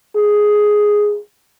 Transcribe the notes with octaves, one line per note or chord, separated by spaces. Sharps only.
G#4